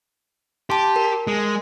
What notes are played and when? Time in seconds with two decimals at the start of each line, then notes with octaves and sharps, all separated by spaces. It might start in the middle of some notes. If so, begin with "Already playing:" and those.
0.70 G4 A5 C6
0.96 A#4
1.27 G#3